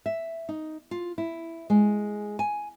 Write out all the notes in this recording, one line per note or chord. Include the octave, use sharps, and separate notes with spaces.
E5
D#4
F4
E4
G#3
G#5